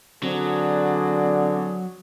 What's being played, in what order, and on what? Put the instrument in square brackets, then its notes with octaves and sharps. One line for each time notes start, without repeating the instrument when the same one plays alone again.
[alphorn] D3 [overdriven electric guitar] F#3 [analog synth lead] C4 [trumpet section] F#4 G#4 D5